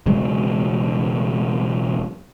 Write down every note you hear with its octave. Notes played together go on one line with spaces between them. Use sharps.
E1 C#3 F#3 G#3